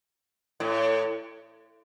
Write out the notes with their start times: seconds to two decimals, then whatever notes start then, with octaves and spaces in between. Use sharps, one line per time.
0.60 A2